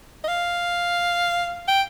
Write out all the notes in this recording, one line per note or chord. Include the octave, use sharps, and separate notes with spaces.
D#5
F5
G5